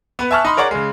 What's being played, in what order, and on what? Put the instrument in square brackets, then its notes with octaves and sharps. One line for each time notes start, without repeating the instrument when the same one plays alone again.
[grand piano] B3 B4
E5 G#5 A5 C#6 F6 F#6
D#4 B5 C6
G#4 A#4 C#5 D5 F#5
C#3 G#3